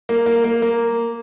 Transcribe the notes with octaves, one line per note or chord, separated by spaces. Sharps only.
A#3
A#3
A#3
A#3